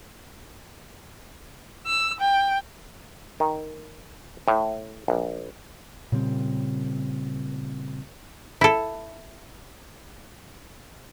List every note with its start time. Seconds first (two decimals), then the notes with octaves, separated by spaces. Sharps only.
1.87 E6
2.20 G5
3.40 D#3
4.48 A2
5.08 A#1
6.12 A#2 C#3 G3 C4
8.61 E4 A4